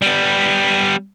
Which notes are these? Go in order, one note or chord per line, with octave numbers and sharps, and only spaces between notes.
G3 B3